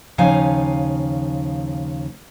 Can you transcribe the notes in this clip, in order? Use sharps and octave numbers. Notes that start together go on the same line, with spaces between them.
D#2 C#3 F3 D#4 F5 G#5